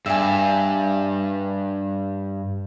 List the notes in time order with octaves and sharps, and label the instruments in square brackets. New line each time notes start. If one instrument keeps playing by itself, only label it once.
[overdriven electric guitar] G2 [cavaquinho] E5 G#5